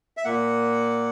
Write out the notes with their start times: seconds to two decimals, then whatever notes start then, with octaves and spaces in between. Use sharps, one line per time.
0.17 E5
0.25 A#2 A#3 F#5